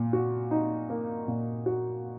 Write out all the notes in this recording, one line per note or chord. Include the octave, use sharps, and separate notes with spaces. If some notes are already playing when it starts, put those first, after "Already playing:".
Already playing: A#2
F#4
D#4
A#3
A#2
F#4